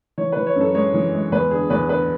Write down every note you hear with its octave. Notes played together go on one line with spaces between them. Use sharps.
E3 C#5
E3 B4
C#5
F#2 A4
G#3 C#5
E3
G#3
E2 B4
D3 G#4
E2 B4
D3 B4